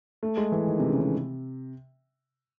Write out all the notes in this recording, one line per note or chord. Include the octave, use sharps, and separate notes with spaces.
A3
G#3
E3
D#3
C3
C#3
C3